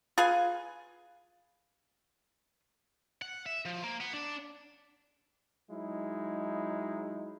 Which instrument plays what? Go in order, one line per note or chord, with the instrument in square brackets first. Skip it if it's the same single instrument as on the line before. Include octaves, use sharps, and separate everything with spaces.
[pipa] F4 G#4 B4 G#5
[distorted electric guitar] F#5
E5
F3
A#3
B3
D4
[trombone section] F#3 G#3 D#4 E4